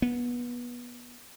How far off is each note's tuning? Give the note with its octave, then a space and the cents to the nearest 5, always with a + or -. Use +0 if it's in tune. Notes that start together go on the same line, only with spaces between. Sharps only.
B3 -25